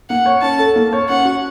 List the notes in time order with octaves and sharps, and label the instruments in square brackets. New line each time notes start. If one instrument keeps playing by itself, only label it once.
[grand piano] A#3 [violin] F#5
[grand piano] C#5
[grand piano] C#4 [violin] A5
[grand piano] A4
A#3
C#5
[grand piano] C#4 [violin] F#5
[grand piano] F#4